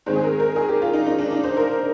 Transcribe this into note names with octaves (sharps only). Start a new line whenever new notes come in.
G#2 D#3 G#3 C4 C5
G#4
A#4
A#4
G#4
G4
F4
D#4
D#4
D4
D#4
C5
A#4